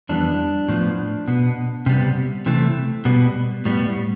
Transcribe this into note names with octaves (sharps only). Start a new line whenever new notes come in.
F2 E3 G3 B3 D4
A2 F3 B3
B2 B3
C3 G3 B3
C3 E3 A3
B2 G3 B3
A2 G3 B3